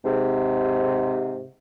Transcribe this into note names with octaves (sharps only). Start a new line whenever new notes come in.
G#2 C3